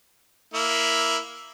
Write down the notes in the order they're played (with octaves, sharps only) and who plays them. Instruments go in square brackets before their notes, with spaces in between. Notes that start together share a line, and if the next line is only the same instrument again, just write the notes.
[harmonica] A#3 E4